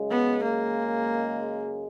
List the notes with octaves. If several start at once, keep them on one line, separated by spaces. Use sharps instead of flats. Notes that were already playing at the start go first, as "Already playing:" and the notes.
Already playing: F#2 C#3 G#3
B3
A#3